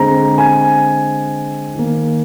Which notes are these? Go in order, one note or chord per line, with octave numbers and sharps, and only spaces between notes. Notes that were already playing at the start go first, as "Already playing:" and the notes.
Already playing: D3 G#3 C4 A#5
G#5
D#3 A#3